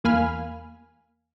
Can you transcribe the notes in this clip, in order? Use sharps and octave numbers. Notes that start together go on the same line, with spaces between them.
E2 A#3 F5 G#5 B5 F6